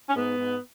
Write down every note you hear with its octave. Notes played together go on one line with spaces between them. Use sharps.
C#4
G#2 B3
G#2